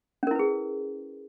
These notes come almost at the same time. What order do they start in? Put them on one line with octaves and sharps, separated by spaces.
C#4 A#4 E4 B4 G#4